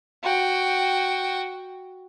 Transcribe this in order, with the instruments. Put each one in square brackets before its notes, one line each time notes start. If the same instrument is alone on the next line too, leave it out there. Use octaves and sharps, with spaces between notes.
[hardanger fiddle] F#4 G5